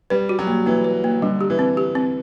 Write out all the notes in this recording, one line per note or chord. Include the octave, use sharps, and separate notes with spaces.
G3 B4
F#4
F#3
A#3
E3 A#3
B4
A#3
D3 G3
G4
E3
C4
G4
C4